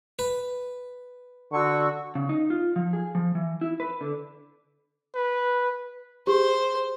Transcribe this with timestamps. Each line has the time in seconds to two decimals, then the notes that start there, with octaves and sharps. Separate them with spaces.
0.19 B4
1.52 D3 F#4 C#6 E6
2.15 C#3
2.29 D#4
2.50 F4
2.76 F3
2.93 G#4
3.15 F3
3.35 E3
3.61 E4
3.80 B4
4.01 D3
5.15 B4
6.27 G4 G#4 C5